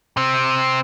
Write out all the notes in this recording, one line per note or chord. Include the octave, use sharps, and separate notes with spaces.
C3 C4